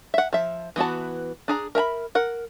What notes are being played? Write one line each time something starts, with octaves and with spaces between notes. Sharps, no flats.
E5 F#5
F3 E5
E3 B3 F#4 A5
D4 G#4 A#5
A#4 E5 A#5 B5
A#4 F#5